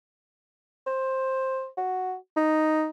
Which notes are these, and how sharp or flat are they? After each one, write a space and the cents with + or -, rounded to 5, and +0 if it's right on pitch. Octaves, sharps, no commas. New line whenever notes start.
C5 +10
F#4 +0
D#4 +0